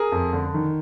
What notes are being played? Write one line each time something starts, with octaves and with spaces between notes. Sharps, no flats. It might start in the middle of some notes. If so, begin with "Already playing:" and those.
Already playing: G#4 A#4
F2
D3
D#3